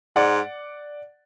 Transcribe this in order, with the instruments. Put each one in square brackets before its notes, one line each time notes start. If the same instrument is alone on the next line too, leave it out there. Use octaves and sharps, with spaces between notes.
[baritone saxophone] G#2 [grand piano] D5 F#5